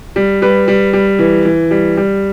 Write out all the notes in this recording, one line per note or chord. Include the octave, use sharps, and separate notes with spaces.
G3
G3 B4
G3
G3
E3
E3
G3
G3